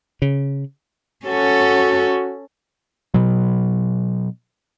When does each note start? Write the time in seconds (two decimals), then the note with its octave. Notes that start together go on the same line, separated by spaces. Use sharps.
0.22 C#3
1.26 C#4 F#4 A4
3.14 B2 F#3